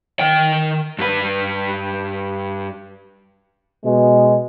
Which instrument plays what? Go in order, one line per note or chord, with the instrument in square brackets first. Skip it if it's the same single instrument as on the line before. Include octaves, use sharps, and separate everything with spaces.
[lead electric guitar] D#3 G5
G2 B4
[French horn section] B2 [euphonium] G#3